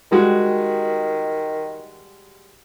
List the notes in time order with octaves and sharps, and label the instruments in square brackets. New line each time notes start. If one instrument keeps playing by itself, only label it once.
[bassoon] D#3 [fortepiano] G3 G#3 F#4